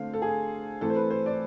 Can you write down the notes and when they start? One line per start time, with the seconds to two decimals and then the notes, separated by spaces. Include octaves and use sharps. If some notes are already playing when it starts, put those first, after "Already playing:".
Already playing: D3 A3 C4 F5
0.13 A4
0.22 G#4
0.81 E3 A3 C4 A4
0.90 C5
0.96 B4
1.11 C5
1.26 D5